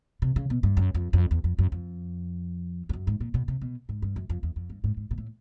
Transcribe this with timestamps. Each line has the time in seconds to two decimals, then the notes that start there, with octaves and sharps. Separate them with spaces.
0.22 C3
0.36 C#3
0.50 B2
0.63 G2
0.77 F#2
0.95 F2
1.13 F2
1.31 E2
1.44 F2
1.59 F#2
1.72 F2
2.89 F2
2.93 F#2
3.07 G#2
3.20 A#2
3.34 B2
3.48 C3
3.61 B2
3.89 G#2
4.02 G2
4.16 F#2
4.29 F2
4.43 E2
4.56 F2
4.70 G2
4.84 G#2
4.97 G#2
5.11 A#2
5.18 A2